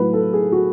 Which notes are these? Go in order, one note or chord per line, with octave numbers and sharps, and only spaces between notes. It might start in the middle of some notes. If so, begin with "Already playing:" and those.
Already playing: A2 F#3 B4
A4
G#4
F#4